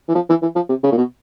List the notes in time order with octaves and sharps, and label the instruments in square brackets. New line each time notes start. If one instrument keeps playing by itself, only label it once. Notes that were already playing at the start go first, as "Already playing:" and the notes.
[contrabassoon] E3
F3
E3
E3
F3
C3
C#3
A#2
B2